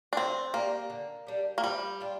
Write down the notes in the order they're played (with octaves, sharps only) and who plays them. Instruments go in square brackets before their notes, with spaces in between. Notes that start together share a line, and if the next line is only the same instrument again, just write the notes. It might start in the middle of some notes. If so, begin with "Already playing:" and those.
[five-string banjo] D4
[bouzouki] D3 [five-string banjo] C4
[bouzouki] G3 D4 G4 [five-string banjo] A#3
[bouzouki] D3
G3 D4 G4
[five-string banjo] A#3
[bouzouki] F3 [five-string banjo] G3
[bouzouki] D4 F4